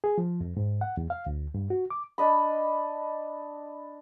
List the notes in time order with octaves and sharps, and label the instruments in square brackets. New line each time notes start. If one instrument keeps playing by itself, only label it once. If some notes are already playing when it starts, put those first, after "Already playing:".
[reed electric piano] G#4
F3
F2
G#2
F#5
E2
F5
D2
G2
F#4
D6
[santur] D4 D#5 B5